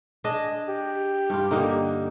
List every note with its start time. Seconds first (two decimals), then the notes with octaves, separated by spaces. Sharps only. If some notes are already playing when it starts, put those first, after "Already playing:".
0.24 D4 G#4 D#5
0.68 G4
1.30 G2 F4
1.51 D3 A#3 D#4